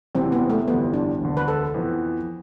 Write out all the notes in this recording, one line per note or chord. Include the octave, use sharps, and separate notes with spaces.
E1 E2 C3 E3 C4
B3
A3
G1 F2 E3 G3 B3
D4
E1 D2 D3
B4
A4
F2 E3 B3